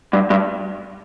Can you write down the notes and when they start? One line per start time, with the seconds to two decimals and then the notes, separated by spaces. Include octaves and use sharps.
0.13 G2
0.30 G2